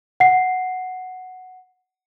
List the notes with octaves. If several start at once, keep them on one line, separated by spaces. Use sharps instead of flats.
F#5 C7